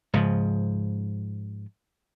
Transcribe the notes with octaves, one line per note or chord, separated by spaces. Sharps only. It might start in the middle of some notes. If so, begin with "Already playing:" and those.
G#2 C#3 F3